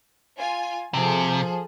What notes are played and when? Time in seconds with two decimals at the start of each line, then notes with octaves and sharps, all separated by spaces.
0.37 F4 G#5
0.94 C3 F3 G#4 A4